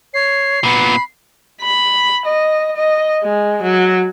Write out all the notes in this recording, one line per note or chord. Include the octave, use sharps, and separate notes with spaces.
C#5 C7
A#2 B3 B5
B5
D#5
D#5
G#3
F#3